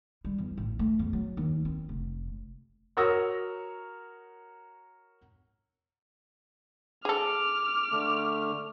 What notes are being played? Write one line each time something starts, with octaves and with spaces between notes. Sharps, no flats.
G3
E2
A1
A3
E2
F#3
D#2
C4
F1
F#4 A#4 C#5 D#6 E6 A#6
G#4 A4 D6 F6
D3 A3